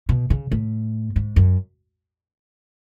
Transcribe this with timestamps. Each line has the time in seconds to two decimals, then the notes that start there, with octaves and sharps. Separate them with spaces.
0.09 B2
0.30 C#3
0.52 A2
1.16 G#2
1.36 F#2